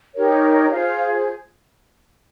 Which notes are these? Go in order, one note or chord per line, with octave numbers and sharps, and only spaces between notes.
D#4 G4 A#4 C#5
F4 G#4 C5 F5